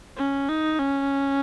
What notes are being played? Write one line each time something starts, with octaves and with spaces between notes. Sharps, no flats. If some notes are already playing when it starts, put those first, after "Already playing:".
C#4
D#4
C#4